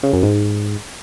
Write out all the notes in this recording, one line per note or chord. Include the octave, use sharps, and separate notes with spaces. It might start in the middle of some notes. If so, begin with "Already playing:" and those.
C#3
F#2
G#2